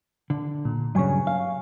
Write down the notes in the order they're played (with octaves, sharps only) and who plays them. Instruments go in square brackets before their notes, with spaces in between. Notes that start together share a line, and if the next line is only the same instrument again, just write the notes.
[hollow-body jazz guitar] D3
[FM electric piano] A#2
[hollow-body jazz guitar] G2 C#3 [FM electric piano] F#3 G#5 C#6
[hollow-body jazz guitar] F5